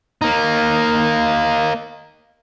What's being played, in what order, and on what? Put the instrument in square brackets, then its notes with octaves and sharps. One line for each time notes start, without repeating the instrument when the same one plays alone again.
[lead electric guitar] A#3 D#4